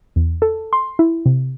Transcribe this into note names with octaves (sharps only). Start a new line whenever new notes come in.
E2
A4
C6
E4
C3